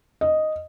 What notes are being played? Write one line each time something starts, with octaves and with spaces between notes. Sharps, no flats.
D#5